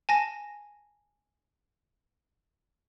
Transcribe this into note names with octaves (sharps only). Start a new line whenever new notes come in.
G#5 A5 A#6